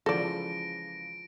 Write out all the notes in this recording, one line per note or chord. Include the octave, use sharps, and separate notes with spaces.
C#3 E3 F3 G#3 A4 D5 A#6 D7